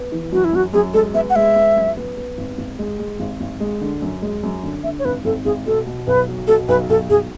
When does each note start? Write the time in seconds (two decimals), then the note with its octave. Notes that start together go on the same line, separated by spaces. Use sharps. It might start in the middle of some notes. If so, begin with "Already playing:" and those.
Already playing: B3
0.12 E3
0.32 F#2 F#4
0.44 E4
0.53 F#2 F#4
0.73 F#2 G#4
0.94 G#3 A4
1.14 B3 E5
1.30 F#5
1.36 G#3 E5
1.56 B3
1.76 F#2
1.97 B3
2.17 B3
2.38 G#1
2.58 G#1
2.79 G#3
2.99 G#3
3.20 G#1
3.40 G#1
3.60 G#3
3.81 D3
4.02 F#2
4.22 G#3
4.43 F#2
4.63 D3
4.84 D3 E5
4.99 C#5
5.05 G#1 B4
5.25 G#1 A4
5.45 G#1 G#4
5.66 B2 A4
5.86 B2
6.07 B1 B4
6.28 F#3
6.47 B2 A4
6.68 B1 B4
6.89 B1 A4
7.10 B1 G#4